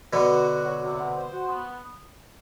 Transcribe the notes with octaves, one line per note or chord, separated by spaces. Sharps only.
B2 D3 B3
F#4
F#4
F#3
C3
B3
C5
F#4
B3